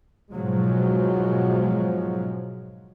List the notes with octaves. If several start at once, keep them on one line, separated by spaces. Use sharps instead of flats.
G#2 B2 F3 F#3 G#3